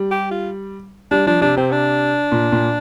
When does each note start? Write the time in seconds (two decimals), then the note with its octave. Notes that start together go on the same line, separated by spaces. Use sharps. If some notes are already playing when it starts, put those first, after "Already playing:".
Already playing: G3
0.11 G4
0.31 F4
1.11 G3 D4
1.26 F3 D4
1.41 C3 D4
1.57 C3 C4
1.71 D4
2.32 A#2
2.52 A#2